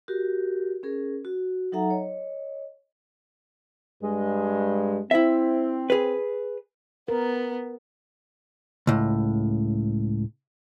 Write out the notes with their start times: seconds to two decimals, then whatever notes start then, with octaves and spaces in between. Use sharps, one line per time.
0.08 F#4 G4 A#4
0.83 C#4 G#4 A#4
1.25 F#4
1.72 F#3 D#4 A4 E5 F#5 A#5
1.90 C#5 D#5
4.03 G2 G#3
5.11 C4 E4 E5
5.90 G#4 B4
7.08 B3 A#4
8.87 C#2 A2